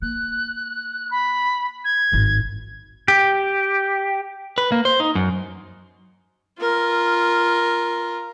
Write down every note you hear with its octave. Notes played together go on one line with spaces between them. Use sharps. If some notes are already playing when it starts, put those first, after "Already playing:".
A#3 F#6
B5
G#6
G#1 A2
G4
B4
A#3
C5
D#4
F#2
F4 A#4